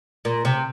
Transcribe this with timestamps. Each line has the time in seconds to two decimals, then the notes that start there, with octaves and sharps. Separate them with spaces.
0.25 A#2
0.45 C3